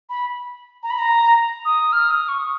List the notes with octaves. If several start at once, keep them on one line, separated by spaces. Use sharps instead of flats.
B5
A#5
B5
A#5
D#6
F6
D#6
C#6